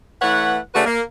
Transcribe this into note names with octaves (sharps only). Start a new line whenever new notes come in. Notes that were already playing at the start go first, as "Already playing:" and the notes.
E3 A3 B4 C#5 F#5
C#3 A3 D4 F#4 G#4 B4
A#3